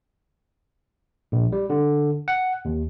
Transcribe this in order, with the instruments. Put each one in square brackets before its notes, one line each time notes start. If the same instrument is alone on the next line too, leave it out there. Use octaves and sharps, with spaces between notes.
[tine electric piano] A#1
G3
D3
F#5
D#2